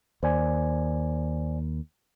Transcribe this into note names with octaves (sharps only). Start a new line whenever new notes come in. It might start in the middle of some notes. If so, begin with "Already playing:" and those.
D#2 C5 D5 G#5